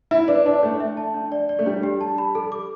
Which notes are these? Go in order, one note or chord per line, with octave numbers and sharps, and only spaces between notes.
E4 E5
D4 B4
D4 A5
A3 D4
E5
A5
D4
D5
D5
A3
G3 D4
G4
A5
B5
A4
D6